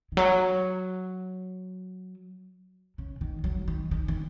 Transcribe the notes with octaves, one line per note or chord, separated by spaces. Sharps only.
D#3
F#3
C#3
D#3
F#3
D#3
D#3
D#3